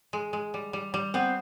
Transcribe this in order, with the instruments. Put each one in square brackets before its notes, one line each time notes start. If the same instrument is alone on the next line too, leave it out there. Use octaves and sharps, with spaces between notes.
[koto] G#3
G#3
G3
G3
G3
[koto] B3 [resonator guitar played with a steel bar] C4